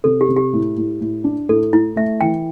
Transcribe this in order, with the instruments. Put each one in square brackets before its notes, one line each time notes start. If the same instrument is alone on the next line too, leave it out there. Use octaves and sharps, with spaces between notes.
[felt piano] C3 [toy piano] A4
[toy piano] G4
[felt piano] C3
[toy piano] G4
[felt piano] A2
A2
A2
D4
[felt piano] A2 [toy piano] A4
[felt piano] A2 [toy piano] E4
[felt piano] A3 [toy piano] E5
[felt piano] E3 [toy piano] G5